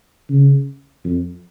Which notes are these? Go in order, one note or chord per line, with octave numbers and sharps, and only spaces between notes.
C#3
F2